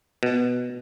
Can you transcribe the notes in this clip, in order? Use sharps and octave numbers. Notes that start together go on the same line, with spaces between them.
B2